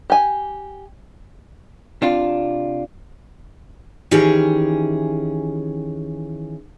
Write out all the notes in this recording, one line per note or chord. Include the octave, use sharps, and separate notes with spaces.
G4 G#5
C3 D4 F4
D#3 E3 C#4 G4 G#4